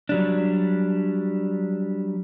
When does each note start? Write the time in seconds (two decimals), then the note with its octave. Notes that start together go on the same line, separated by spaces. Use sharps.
0.09 F#3 G3 D4